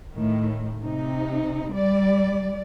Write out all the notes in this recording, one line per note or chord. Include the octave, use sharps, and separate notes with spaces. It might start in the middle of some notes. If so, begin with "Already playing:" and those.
A2 D#3
C3 D#4
G3 D5